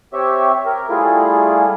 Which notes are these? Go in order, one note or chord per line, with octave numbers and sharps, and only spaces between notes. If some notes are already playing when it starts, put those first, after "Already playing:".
C4 G4 C#5 E5
A#4
G3 A3 E4 F4 G#4